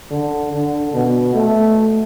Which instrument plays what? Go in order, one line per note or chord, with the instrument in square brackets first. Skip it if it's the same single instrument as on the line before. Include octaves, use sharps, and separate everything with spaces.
[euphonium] D3
D3
B2
A3